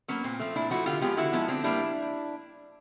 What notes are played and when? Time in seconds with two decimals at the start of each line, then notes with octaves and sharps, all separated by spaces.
0.08 F#3 A#3 B3 C#4
0.24 A#2 C4
0.40 F3 A3
0.55 A#2 D4 E4
0.70 F3 A3 E4 F#4
0.86 D3 F4 G4
1.02 F3 G#3 B3 F4 G4
1.17 D3 E4 F#4
1.33 F3 G#3 B3
1.48 D3 C4 D4
1.64 G3 A#3 D4 E4